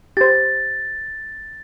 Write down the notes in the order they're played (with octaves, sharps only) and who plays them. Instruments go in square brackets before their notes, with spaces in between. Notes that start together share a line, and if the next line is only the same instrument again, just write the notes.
[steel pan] G4 C5 [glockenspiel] A6